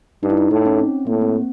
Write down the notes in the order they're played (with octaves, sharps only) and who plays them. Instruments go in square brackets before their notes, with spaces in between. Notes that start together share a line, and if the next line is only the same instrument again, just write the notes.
[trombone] G2 [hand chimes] D#4
[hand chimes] E4
D#4
[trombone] A2 [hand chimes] D#4
[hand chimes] C#4
C4
[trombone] A2 [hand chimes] A#3
[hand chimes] C4